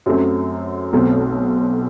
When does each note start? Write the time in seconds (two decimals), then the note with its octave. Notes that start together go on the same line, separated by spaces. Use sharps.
0.06 F#2 F#3 A3 C4
0.93 B1 B2 A3 C4